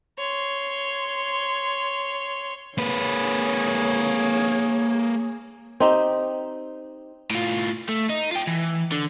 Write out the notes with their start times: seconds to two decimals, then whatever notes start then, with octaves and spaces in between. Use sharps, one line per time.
0.18 C#5 C6
2.78 A#3 G#4 B4 C#5
5.80 C4 D#4 G4
7.31 A2 F4
7.89 A3
8.10 D#4
8.32 F4 G5
8.47 E3
8.92 D3